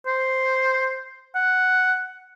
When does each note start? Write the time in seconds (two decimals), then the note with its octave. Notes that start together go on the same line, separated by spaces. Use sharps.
0.06 C5
1.35 F#5